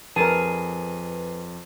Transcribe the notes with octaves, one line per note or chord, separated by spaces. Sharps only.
F2 G#4 A#4 B4 A5